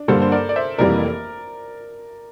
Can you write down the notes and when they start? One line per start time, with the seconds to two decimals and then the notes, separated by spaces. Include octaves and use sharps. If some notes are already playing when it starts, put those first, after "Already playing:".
Already playing: D4
0.08 G2 D3 G3 A#3 A4 C5
0.22 C5
0.32 A#4 D5
0.49 D5
0.56 C5 E5
0.78 F1 F2 E3 G3 A#3 A#4 D5